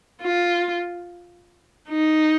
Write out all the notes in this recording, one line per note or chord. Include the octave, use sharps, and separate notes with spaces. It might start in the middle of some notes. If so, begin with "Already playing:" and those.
F4
D#4